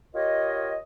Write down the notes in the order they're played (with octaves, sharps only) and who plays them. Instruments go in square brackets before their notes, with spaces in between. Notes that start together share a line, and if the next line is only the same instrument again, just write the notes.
[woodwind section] F4 G4 A#4 C#5 D#5